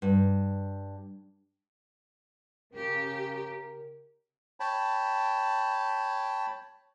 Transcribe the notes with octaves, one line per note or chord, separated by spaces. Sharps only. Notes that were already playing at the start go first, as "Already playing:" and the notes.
G2
C#3 G4 A#4
C#5 G5 A5 B5